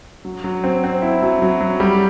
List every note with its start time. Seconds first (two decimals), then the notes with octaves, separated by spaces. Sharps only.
0.25 F#3
0.44 F#3
0.64 C4
0.84 C4
1.02 E4
1.22 F#3
1.42 F#3
1.61 F#3
1.80 G3